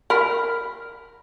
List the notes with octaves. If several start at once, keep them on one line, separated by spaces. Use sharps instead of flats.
A#4 B5 F6 B6